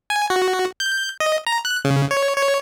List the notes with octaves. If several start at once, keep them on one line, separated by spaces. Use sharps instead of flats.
G#5
F#4
G6
D#5
A#5
F#6
C#3
C#5
C#5